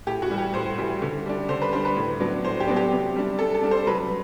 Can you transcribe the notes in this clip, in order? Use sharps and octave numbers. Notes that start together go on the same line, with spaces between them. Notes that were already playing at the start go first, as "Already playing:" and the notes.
A2 G4
F#4
E3 G3
G4
A2 C5
E3 G3
D3
G3 D4
D3 C5
B4
G3 D4 C5
B4
A2
F#3 B3 D4
A2 C5
G4
F#3 B3 D4
G4
C3
G3 D4
C3 A4
A4
G3 D4
C5
F#3 B4